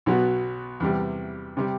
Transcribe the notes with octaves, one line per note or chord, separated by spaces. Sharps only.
B1 B2 F#3 B3 F#4
E2 C3 G3
C3 G3